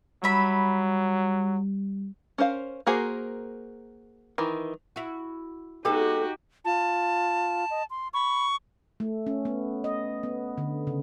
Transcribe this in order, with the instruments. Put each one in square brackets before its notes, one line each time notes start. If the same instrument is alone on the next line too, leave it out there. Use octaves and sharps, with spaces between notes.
[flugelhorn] F#3 [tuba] G3 [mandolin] E5 B5
[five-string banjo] C#4 A#4 C5 F5
A#3 F#4 G#4 A#4 C5
D#3 E3
[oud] E4 F#4
[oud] G#3 B3 A4 [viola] D#4 F#4 [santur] G4
[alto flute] F4 [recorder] A5
[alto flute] D#5
C6
[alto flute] B5 [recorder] C#6
[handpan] A3
C#4
B3
D#5
B3
D3
C#3